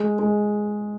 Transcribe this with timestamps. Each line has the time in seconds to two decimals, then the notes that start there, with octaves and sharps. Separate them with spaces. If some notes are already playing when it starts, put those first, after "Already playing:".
Already playing: G#3
0.19 G#3